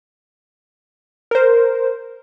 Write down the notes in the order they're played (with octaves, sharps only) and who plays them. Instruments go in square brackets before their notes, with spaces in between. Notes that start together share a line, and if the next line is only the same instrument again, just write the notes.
[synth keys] A#4 C5